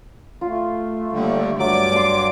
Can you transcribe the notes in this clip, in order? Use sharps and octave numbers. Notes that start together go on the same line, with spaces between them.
A3 F4
D#2 D3 G3
G2 F#3 D5 D6
A5 C6